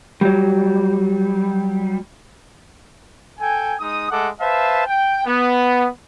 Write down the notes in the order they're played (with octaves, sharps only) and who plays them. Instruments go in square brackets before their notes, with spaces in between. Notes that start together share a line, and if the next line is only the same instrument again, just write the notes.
[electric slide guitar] F#3 G3
[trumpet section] A4 G5 G#5
G#3 D#4 D#6
G#3 A3 A4 F#5 D6
B4 C5 E5 F5 A5
G5
B3